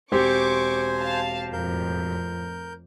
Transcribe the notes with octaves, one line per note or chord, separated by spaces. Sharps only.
E1 C4 G4 C5 G#5 C#6 D6
F5 A5
F2 A2 A#4 G6